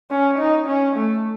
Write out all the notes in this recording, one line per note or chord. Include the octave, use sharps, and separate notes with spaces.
C#4
D#4
C#4
A3